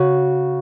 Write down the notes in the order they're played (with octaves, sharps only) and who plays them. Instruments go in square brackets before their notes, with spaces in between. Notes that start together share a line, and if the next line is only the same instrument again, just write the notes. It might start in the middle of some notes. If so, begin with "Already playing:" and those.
Already playing: [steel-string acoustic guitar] C#3 F#4